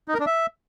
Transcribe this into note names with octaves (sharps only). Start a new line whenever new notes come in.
D#4
A#4
D4
E5